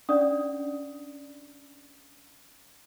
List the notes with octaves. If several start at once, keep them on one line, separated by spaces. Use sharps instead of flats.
C#4 D4 D5 F#5 D#6